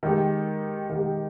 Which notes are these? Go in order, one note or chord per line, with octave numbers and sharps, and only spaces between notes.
D#3 G#3 D#4 G4
D#3 G#3 D#4 G4